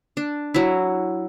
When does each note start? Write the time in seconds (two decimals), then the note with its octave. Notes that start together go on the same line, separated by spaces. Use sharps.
0.17 D4
0.54 F#3 E4